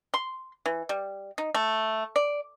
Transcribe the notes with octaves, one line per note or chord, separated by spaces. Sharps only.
C6
E3
G3
D#4
A3
D5